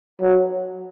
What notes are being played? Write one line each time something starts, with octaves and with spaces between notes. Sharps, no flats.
F#3